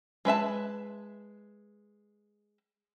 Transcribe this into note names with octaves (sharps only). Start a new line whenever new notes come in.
G#3 B4 E5 A5